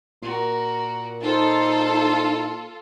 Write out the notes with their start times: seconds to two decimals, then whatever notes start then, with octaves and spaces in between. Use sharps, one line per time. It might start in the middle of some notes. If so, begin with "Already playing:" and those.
0.22 A#2 F#4 A#4
1.23 D#4 F4 A4 C5